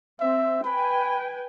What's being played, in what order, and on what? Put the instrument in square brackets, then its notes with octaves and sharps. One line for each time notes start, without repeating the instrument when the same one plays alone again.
[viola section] C4 [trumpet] E5
[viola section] B4 G5 G#5 [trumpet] B5